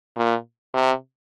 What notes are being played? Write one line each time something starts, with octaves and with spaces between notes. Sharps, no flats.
A#2
C3